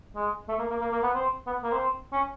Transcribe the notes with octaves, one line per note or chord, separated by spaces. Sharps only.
G#3
A3
A#3
A#3
A#3
A#3
B3
C4
B3
A#3
C4
C#4